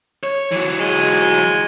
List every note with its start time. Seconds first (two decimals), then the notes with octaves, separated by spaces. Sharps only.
0.23 C#5
0.52 E3 F#3
0.80 G#3